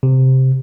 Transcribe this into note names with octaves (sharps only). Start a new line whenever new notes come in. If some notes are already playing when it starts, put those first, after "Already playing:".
C3